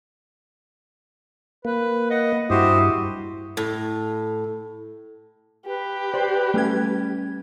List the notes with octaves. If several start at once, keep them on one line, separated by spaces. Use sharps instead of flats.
A#3 B4
D#5 F#5
G2 E4 F#4 G4 C5 D#6
A2
G4 B4
C5 D5
G3 A3 C#4 G#6